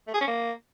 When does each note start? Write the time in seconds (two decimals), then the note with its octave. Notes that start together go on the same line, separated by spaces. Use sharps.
0.07 A3
0.14 G#4
0.21 C#4
0.28 A#3